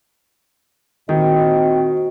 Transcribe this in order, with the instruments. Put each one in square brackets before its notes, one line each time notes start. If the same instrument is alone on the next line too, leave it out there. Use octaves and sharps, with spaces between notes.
[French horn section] A#2 C4 D#5 [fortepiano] D#3 [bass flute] F#4 [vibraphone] G5